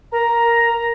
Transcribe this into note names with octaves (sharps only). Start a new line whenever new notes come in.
A#4 A#5